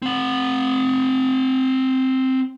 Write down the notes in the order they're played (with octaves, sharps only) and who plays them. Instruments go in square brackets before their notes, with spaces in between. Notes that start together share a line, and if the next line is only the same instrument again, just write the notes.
[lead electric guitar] C4 F#5